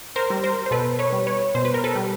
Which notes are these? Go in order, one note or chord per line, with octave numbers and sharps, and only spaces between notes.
A#4 C5
G3
A#4 C5
C5
B2 A4 B4
B4 C#5
G3
B4 C#5
B2 C5
B4
A#4
A4 B4
G3